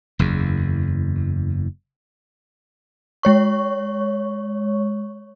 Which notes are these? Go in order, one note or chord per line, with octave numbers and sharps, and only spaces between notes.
F#1 E2
G#3 C#5 C#6